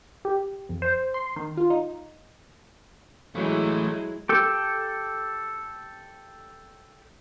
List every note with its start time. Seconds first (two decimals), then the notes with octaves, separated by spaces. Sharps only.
0.25 G4
0.69 F2
0.82 C5
1.14 C6
1.36 D#3
1.57 F4
1.70 D#4
3.35 E3 F#3 G#3 A3 E4
4.29 G4 A4